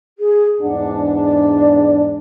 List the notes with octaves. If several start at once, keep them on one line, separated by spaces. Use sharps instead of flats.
G#4
E2 G#2 D4 F#5
D5